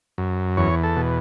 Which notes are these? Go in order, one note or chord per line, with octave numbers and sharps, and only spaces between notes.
F#2
E2 C#5
A4
B2